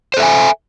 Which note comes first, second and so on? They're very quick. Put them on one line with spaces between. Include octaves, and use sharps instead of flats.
C5 A4 E5 G#5